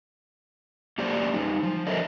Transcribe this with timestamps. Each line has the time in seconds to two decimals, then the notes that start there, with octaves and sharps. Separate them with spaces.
0.98 A#3 C#4 G4 C5 D5
1.33 G3 D#4
1.63 F3
1.87 D4 A4 A#4 C5 D#5 E5